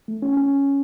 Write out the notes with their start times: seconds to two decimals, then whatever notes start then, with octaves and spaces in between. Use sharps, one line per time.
0.08 A3
0.22 C#4
0.37 C#4